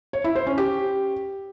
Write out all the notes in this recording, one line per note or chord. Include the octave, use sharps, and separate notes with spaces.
C#5
E4
C5
C#4
G4